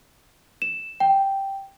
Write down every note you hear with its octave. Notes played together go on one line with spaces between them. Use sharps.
E7
G5